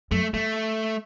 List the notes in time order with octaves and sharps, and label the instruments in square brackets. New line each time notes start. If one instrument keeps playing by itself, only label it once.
[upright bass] F#2 [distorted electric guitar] A3
[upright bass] G2 [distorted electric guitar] A3